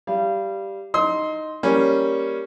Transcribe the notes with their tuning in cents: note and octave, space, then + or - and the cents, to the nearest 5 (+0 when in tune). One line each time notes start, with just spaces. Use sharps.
G3 +0 F5 -25
D#4 +0 C6 +0 D#6 +45
G3 +0 A#3 +0 C#4 +0